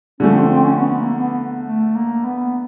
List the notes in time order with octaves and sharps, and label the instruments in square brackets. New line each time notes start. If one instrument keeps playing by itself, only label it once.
[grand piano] D3 F3 A3 [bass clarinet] C#4
[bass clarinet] C4
C4
C#4
B3
A#3
B3
A3
A#3
B3